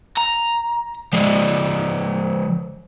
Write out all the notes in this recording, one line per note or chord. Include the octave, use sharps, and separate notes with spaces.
A#5
F3 G#3